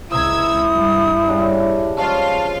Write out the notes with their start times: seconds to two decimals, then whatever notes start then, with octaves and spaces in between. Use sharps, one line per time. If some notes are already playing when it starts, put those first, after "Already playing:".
0.12 C#2 E4 C5 A#5 D#6 E6 G#6
0.74 G2
1.28 C#3 G3 D4
1.97 F3 G#3 C#4 F4 F5 A5